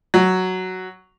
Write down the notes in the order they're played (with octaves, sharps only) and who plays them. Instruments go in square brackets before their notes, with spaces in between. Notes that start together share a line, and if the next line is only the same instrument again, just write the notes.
[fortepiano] F#3